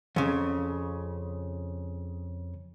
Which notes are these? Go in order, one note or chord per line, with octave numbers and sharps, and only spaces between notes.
F2 C#3